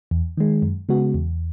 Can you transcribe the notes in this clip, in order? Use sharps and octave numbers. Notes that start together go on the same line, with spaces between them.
E2
D#3 G#3
F#2
C#3 G#3 B3 F#4
E2